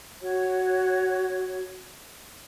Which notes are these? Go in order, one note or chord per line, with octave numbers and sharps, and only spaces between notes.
F#4 C#5